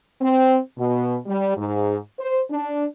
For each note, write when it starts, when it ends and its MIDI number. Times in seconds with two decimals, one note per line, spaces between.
0.21 0.57 60
0.77 1.17 47
1.26 1.56 55
1.57 1.96 44
2.19 2.41 72
2.50 2.84 62